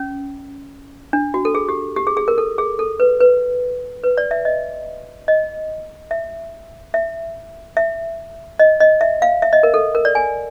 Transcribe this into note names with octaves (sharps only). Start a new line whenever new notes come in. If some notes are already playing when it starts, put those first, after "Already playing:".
Already playing: C#4
D4
F#4
A4
G#4
G4
G4
G#4
G#4
A#4
A4
G#4
A4
B4
B4
B4
D5
E5
D#5
D#5
E5
E5
E5
D#5
D#5
E5
F5
E5
D#5
A#4
A4
A#4
D5
G#5